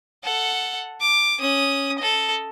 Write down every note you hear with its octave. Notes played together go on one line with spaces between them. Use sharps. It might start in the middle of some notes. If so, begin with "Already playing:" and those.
A4 F#5
D6
C#4 D#6
A4 D#5